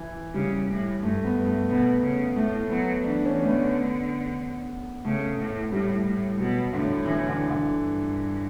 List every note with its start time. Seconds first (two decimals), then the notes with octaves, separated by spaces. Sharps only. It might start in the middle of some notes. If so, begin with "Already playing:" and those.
Already playing: E3
0.34 C#3 G3
0.69 A2
1.02 G2 A3
1.24 B3
1.35 G2
1.46 A3
1.69 B2 B3
2.02 C#3
2.36 A2 A3
2.69 F#3 B3
3.04 E3 D4
3.25 C#4
3.38 D3
3.43 A3
3.48 B3
5.05 C#3 A3
5.39 A2
5.72 A2 G3
6.06 A2
6.39 B2 F#3
6.73 A2 D3
7.06 E3
7.29 D3
7.50 D3
7.73 G2